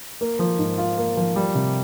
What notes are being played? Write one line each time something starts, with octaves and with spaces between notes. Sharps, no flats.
A#3
F3
G#2
F4
A#3
F3
G3
C3